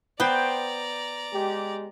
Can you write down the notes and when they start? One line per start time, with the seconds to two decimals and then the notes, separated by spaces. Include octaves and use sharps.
0.20 B3 C5 D5 G5 A#5 B5
1.33 G#3 G4